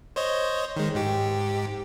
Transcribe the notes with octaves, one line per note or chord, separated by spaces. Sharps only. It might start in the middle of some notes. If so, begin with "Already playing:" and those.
C5 C#5 D#5
D#3 G#3
G#2 G4